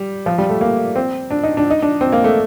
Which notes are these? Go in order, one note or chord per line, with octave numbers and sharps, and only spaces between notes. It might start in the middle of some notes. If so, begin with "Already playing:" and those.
Already playing: G3
F3
G3
A3
A#3
C4
D4
D#4
D4
D#4
D4
C4
A#3
A3